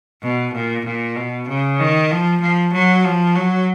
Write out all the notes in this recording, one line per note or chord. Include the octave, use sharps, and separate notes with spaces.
B2
A#2
A#2
B2
C#3
D#3
F3
F3
F#3
F3
F#3